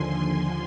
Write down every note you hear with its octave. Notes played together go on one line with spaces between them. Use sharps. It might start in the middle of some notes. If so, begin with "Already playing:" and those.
Already playing: D#2 D3 F3 G#5 C6